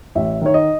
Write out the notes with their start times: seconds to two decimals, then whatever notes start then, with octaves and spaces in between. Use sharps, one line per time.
0.15 A1 E5
0.41 D#3 C#5
0.54 D#5